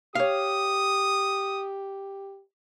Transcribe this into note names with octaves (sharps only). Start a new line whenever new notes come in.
G4 C#5 F5 D#6